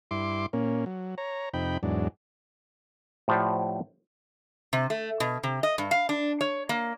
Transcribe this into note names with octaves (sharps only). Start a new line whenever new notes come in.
G2 E4 C6 D6
A#2 A#3 C#4
F#3
C#5 A#5
F2 C3 D#4 G5 B5
E2 G#2 F#3 D4
A2 F3 G4 C5 D5 F#5
C3
A3
B2
C3
D#5
G2
F5
D4
C#5
A#3